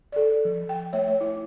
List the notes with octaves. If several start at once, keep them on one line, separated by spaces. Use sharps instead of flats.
A4 D5
F3
G5
A3 C#5 E5
C#5
E4